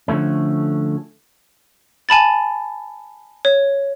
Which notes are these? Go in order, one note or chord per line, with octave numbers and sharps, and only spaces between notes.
D3 F3 A3 C#4
G#5 A5 B5 A6
C#5